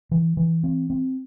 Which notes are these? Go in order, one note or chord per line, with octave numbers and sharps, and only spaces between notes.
E3
E3
C4
C4